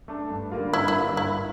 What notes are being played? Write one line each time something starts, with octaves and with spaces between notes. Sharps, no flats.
A3 D4 A4
G2
D3 G3 A#3 F4
G2 E4
E4
D3 G3 A#3 F4
G2 E4